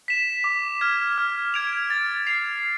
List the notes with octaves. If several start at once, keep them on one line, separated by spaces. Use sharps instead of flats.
B6 E7
D6
F6 G#6
F6
G#6 D7 F7
A6
C7 F7